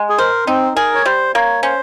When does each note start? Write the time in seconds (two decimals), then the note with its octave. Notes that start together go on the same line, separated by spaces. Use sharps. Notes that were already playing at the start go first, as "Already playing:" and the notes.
Already playing: G#3
0.09 G#4
0.18 A#4 C5
0.47 C4 D#4
0.76 G#4 A#4
0.94 C#5
1.06 G3 C5
1.34 A#3 C#5
1.63 C#4 C5